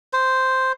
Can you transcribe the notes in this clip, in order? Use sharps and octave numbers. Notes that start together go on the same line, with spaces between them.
C5